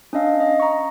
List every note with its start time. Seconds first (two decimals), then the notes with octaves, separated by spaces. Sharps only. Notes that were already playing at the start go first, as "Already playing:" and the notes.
0.13 C#4 D4 D#5 F5
0.40 D#5
0.60 A#5 C#6